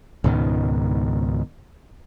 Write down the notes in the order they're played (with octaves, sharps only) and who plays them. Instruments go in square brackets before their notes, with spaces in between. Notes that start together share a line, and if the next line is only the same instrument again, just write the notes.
[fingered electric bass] C#2 G#2 B2 D#3